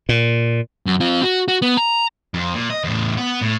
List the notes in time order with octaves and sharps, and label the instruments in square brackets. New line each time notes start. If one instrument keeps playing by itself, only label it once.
[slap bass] A#2
[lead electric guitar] F#2
C4 F4
F#4
F#4
B3
A#5
[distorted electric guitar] F2
A#2
D#5
E2 A2
B3
A2